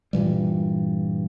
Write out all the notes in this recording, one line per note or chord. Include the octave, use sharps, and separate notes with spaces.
G2 A#2 E3 G3